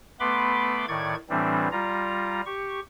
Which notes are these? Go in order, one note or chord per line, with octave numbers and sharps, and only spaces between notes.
A3 B3 B4 B5 C6 D6
A2 D#3 D5 C#6 G#6
A2 E3 G3 C4 D4
G3 F4 A#5
G4 C#6